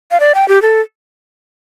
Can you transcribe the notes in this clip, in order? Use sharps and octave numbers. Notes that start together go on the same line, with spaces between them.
F5
D5
G5
G4
A4